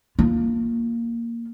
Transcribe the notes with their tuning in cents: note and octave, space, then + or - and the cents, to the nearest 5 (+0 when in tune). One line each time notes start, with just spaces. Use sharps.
A#3 -5 F4 +0